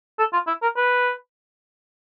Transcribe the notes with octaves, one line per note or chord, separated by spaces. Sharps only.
A4
F4
E4
A#4
B4